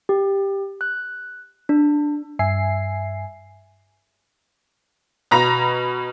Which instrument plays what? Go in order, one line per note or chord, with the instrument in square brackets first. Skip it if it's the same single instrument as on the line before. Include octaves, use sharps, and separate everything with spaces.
[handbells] G4
F#6
D4
[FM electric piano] G2 E5 G#5 C7
[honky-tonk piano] B2 A#5 B5 A#6